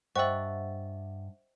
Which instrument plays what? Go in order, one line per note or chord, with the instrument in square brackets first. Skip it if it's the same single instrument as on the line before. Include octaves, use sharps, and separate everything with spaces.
[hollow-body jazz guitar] G2 [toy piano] C5 D#5 G5 [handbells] E5 F#5 [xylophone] C#6 E6